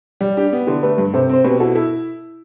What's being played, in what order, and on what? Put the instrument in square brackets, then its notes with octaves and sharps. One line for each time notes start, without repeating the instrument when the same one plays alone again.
[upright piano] G3
[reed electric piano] D4 [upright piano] G4
[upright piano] B3
[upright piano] D3 [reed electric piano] E4 G4
[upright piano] A3 [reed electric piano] G4 B4
[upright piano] G2
[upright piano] C3 [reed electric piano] A4 C5
[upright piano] C4 [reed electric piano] C5
[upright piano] B2 [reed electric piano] G4 B4
[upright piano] E4 [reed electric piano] F#4 A4
[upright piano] E4 [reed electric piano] A4